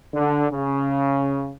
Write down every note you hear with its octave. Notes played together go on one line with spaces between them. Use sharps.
D3
C#3